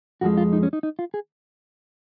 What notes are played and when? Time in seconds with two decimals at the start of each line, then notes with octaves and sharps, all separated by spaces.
0.21 F2 F3 G#3 F#4
0.37 F4
0.53 D#4
0.63 C#4
0.73 D#4
0.83 D#4
0.99 F4
1.14 G#4